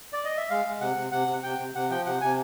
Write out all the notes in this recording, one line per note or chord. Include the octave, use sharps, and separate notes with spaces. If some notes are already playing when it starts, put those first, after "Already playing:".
D5
D#5
E5
G#3 F5
G#3
C3 F#5
C3
C3 F#5
C3
C3 G5
C3
C3 F#5
F3 G5
C3 F#5
C3 G#5